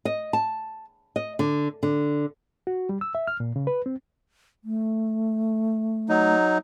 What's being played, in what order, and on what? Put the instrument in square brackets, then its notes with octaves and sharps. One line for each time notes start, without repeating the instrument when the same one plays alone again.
[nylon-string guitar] D#5
A5
D#5
D3
D3
[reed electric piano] F#4
G3
E6
E5
F6
A#2
C#3
B4
C4
[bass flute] A3
[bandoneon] F#3 D#4